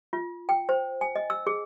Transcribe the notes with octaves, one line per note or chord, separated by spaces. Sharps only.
F4
G5
C5
G#5
D#5
E6
G#4